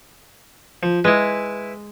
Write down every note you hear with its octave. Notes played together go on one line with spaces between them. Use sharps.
F3
G#3 E4 B4